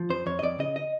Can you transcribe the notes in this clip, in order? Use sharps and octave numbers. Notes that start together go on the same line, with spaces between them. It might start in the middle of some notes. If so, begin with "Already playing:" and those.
Already playing: F3
F2 C5
F2 C#5
D#5
F2 D5
C#3 D#5
D#5